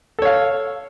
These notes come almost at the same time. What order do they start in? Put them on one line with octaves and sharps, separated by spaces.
A4 C#5 F5